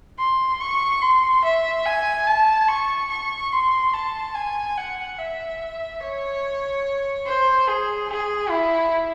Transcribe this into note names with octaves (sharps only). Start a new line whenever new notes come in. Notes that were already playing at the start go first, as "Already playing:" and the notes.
C6
C#6
C6
E5
G#5
A5
C#6
C#6
C6
A5
G#5
F#5
E5
C#5
C5
G#4
G#4
E4